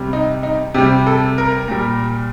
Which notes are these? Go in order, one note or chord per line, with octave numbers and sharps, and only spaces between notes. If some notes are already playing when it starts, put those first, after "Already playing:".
Already playing: C3 G3
D#4
D#4
C3 G3 G4
A4
A#4
A#2 G3